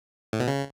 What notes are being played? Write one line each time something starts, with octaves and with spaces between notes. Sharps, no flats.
A2
B2
C#3